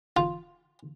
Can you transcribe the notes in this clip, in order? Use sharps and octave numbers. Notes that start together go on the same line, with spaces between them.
F4